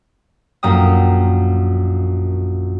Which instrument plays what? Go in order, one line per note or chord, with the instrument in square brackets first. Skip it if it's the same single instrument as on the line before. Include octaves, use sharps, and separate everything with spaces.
[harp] A#1 F#2 A#3 G5 D#6